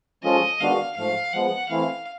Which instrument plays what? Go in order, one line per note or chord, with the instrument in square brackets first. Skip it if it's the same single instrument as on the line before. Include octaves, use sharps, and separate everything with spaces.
[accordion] F3 G#3 C#4 F4 A4 [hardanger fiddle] D#5
[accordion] D#3 G#3 B3 D4 F#4 [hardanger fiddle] F5
[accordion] G#2 F3 A3 [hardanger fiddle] F5
[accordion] F3 G#3 B3 [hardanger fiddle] F#5
[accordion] E3 A3 C4 E4 [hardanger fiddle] F5